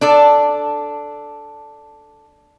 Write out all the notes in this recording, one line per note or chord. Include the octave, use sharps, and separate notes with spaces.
D4 A4 D5